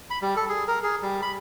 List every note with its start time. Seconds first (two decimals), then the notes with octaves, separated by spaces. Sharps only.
0.10 B5
0.22 G3
0.36 A4
0.49 G#4
0.68 A#4
0.83 G#4
1.03 G3
1.22 B5